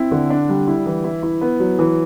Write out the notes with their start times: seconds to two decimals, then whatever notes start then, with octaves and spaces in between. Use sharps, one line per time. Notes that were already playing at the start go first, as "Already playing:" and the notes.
Already playing: C4 E4
0.11 D3
0.30 D4
0.49 G3
0.67 E4
0.86 E3
1.04 E4
1.23 E4
1.41 B3
1.60 F#3
1.79 E3